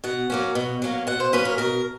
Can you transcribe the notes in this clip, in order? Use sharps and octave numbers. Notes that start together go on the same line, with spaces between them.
B2 F#5
F#3 A#3 C#4
B2
F#3 A#3 C#4
B2 F#5
C5
F#3 A#3 C#4 B4
A#4
B2 A#4